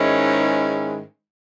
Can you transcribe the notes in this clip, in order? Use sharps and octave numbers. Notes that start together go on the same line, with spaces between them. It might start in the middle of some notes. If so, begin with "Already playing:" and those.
Already playing: G#2 D#3 G#3 C#4 E4